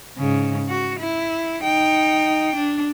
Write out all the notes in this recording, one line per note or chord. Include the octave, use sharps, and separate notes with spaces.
G#2 C#3
F#4
E4
D#4 G5
D4